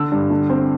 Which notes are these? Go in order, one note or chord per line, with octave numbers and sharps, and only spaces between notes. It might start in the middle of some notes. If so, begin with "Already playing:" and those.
Already playing: D3 E6
G2
D3
C4